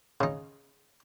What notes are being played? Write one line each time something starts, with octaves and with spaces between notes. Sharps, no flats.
C#3 D#4